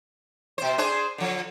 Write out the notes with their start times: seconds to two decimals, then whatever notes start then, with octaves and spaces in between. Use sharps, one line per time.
0.58 B2 C5
0.78 D4 G#4 C5
1.18 D3 F3